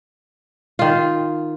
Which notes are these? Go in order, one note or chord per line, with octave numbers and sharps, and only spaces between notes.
D#3 F4